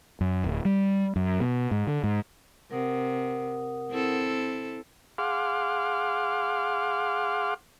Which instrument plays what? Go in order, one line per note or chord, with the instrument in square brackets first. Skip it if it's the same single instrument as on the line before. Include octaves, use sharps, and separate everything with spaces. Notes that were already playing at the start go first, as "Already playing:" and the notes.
[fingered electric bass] F#2
D1
G3
F#2
B2
G#2
D3
G#2
[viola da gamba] C3 [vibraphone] A#4 F#5 D#6
[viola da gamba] C4 E4 A4
[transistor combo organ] G#4 F5 F#5 C6 D6 F6